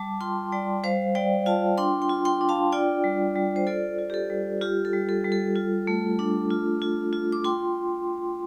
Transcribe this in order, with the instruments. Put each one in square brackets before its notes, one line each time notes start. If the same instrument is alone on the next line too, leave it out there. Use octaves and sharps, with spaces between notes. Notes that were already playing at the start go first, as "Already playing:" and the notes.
Already playing: [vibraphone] G3 A5 D6
F4 G5 C6
G3 D5 G5
G3 C5 F5
G3 D5 G5
F4 F5 A5
D4 G5 C6
G5 C6
F4
G5 C6
D4
F5 A5
F4 D5 G5
G3
G3
C5
F4 A4 D5
F4
G4
A4
G3
F4 G4
A4
G3
A4
G3
A4
F4
A3
D4
F4
F4
F4
D6
F4 G5 C6